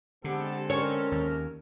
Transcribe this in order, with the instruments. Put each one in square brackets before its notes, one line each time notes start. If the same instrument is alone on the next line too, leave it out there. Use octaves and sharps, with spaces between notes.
[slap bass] D3 [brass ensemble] G#3 C4 A4 [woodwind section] B3 G4
[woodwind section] C#4 A#4 [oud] C#5
[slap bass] D#2